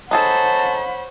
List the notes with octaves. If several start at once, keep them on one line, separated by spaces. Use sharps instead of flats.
D#4 G#4 A4 C5 C#5 F#5 A5 B5